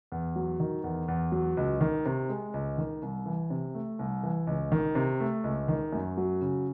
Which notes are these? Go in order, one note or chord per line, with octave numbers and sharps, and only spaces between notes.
E2
F#3
D#3
E2
E2
F#3
C#2
D#3
C3
G#3
C#2
D#3
C2
E3
C3
A3
C2
E3
C#2
D#3
C3
A3
C#2
D#3
F#2
F#3
C#3